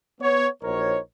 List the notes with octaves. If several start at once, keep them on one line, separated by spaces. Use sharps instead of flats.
B3 C#5
A#1 D#4 F#4 A#4 C5 C#5